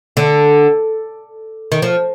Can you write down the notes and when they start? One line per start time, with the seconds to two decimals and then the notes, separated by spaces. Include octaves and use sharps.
0.17 D3
1.72 D#3
1.82 F3